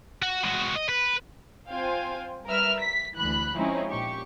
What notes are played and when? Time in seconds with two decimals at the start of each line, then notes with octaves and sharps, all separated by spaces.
0.22 F#4
0.43 G#3 F#4
0.76 D#5
0.89 B4
1.69 C4 F4 C5 F5 G5 G#5
2.46 G3 A#4 B4 E5 E6 F6
2.79 B6
3.16 D2 E3 B5 F#6
3.55 F3 G#3 C4 C#4 D#4 E4
3.89 A#2 G4 C#6